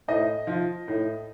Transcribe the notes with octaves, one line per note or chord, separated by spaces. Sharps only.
A2 D#5
F3
A2